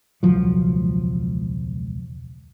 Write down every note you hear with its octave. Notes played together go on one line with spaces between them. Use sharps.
E1 C#2 F3 F#3